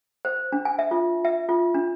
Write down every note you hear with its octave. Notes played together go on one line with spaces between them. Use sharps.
C5
D4
G#5
E5
F4
E5
F4
D4